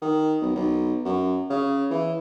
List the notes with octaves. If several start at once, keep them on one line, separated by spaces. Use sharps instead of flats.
D#3
B1
B1
F#2
C#3
E3